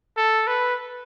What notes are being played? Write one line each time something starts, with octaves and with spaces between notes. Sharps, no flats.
A4
B4